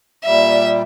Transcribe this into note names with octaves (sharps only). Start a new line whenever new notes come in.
A#2 G3 E5